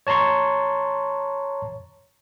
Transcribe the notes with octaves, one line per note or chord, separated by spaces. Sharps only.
C#5 A5 A#5 C6 C#6